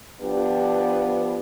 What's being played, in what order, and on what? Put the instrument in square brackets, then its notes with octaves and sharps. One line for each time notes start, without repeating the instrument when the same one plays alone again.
[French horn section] F3 B3 D4 G4